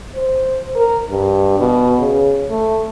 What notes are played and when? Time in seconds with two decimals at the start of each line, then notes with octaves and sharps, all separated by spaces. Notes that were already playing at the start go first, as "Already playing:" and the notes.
0.15 C5
0.76 A#4
1.10 G2
1.60 B2
1.99 C#3
2.51 A3